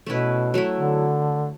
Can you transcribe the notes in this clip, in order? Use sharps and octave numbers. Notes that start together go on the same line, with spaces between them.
B2 A3 C#4 E4 B4
F#3 A3 E4
D3